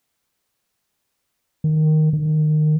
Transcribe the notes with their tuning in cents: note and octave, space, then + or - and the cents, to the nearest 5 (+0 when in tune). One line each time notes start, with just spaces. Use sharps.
D#3 -5
D#3 -25